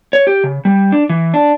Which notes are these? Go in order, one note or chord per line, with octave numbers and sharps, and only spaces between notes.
C#5
G4
C#3
G3
D4
E3
D4